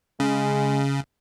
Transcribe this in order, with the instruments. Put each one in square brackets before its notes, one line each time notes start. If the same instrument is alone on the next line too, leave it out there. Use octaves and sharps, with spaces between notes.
[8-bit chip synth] C#3 [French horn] G#3